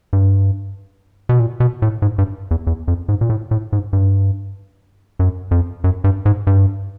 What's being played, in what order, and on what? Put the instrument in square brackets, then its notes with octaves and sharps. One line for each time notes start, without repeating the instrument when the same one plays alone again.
[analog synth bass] G2
B2
A#2
B2
A2
G#2
G2
E2
E2
F2
G#2
A#2
A2
A2
G#2
G2
F#2
F2
F#2
G2
G#2
G2